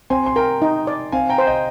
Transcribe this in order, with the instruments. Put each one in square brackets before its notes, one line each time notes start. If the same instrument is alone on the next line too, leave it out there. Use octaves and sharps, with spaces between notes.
[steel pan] C4 [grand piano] G#5 C6
[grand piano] C6
[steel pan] A#4 [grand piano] G5 A#5
[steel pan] D#4
D5
[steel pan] C4 [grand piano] F5 G#5
[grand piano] G5 A#5
[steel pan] C5
[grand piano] D#5 G5